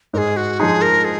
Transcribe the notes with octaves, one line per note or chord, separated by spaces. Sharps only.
G#2 G#4 A#4
F#4
F3 G#3 D#4 G#4
A#4
G#4